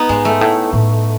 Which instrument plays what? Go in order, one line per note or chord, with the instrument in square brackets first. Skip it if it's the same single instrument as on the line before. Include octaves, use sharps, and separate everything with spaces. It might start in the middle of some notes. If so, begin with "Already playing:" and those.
Already playing: [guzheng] B3 D#4
[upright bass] G#2 [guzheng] G#3
[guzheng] A3
[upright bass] A2
A2